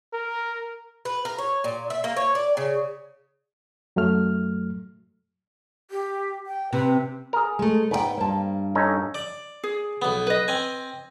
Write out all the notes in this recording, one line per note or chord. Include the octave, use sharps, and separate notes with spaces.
A#4
B4
A#4
C#5
A#2
E5
A#3
C#5
D5
C#3
F#2 F#3 A3 F6
G4
G5
C3 B4
G#4 A#4
G#3 A3
G#2 B3 D5 G5
G2 A#3 C5 A5
C#4 D#4 A4
D5
G#4
B1 B3
B4 D#5
C4 G#5